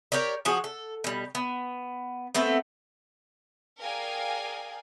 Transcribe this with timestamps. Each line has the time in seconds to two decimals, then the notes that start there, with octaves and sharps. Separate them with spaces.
0.12 G4 A#4 C#5 D5
0.45 F3 F#4 G#4
0.64 A4
1.04 B2 G3
1.35 B3
2.35 A3 B3 C4 A4
3.83 G#4 A#4 D5 F5 G5 G#5